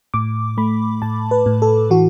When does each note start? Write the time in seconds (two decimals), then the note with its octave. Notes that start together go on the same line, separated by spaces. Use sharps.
0.14 A2 D6
0.57 A3 B5
1.02 A2 A5
1.31 B4
1.46 A2
1.62 A4
1.90 E3 F#4